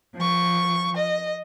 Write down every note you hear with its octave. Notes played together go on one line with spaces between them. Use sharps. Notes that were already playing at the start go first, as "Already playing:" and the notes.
F3 C#6
D#5